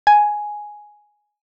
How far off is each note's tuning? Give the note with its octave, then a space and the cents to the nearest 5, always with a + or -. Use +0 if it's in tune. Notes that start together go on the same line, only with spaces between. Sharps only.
G#5 +5